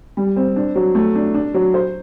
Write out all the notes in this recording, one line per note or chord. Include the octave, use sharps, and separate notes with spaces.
G3
C4
D4
F#3
A3
D4
D4
F#3
C5